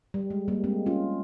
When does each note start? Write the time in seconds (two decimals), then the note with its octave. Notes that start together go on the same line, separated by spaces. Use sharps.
0.14 G3
0.30 G#3
0.48 G3 A#3
0.64 G#3 C4
0.86 C#4 F4